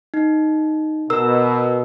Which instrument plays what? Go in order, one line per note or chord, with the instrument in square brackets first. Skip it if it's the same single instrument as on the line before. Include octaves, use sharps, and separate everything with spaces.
[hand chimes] D#4
[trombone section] B2 [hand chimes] A#4 E6